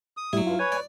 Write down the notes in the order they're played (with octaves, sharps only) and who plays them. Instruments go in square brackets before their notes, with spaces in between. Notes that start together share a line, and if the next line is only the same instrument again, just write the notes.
[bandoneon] D#6
[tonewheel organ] A2 G3 [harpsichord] F#3 E4
[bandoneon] G2 [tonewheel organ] F4
[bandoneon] B4 C#5 [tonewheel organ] G#5
[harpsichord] D5